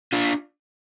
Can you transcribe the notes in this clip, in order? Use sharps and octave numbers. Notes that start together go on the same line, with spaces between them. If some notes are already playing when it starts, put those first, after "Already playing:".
D4 F4